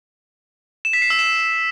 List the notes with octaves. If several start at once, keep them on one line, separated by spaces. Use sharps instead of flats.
E7
B6
C7
E6
E7